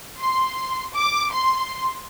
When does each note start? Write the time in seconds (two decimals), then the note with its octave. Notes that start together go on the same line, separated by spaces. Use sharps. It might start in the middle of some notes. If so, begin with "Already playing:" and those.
0.21 C6
0.94 D6
1.32 C6